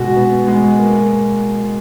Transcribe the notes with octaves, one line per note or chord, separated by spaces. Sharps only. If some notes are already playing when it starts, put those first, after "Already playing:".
Already playing: B2 G#3 F#4
B3
G#3
A#3